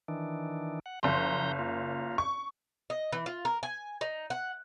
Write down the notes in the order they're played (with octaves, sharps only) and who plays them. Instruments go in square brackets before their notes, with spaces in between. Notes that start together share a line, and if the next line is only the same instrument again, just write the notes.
[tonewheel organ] D#3 E3 D4
F#5
[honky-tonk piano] F#1 C6 [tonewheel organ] F3 A#5 G6
[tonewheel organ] A#3 F4
[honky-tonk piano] C#6
[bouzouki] D#5
E3
F4
A#4
G#5
D#4
F#5